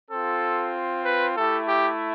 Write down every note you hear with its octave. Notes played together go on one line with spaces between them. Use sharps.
C4 F4 A4
B4
A3 E4 G4 A4
G4